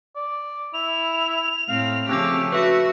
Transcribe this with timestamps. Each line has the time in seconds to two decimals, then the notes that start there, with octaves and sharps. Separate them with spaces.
0.16 D5
0.74 E4 F7
1.69 A2 C4 F5
2.09 C#3 F3 A3 C4 C#4 G4 D6
2.52 F#4 B4 E5 C#6